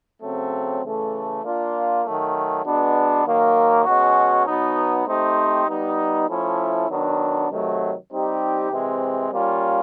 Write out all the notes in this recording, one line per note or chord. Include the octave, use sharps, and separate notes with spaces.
C#3 F#3 A3 C4
C#3 E3 A3
A#3 D4 F4
D#3 F#3 A3
B2 G#3 B3 D4
D#3 F#3 A#3
B2 G#3 C#4 F#4
B2 F#3 B3 D#4
A3 C4 D#4 G4 C5
G3 B3 D#4
F3 A3 C#4 E4
D#3 F#3 B3 D4
C3 D#3 F#3 A3
G3 C4 D#4 G4
C3 E3 G#3 C4
G3 A#3 C#4 F4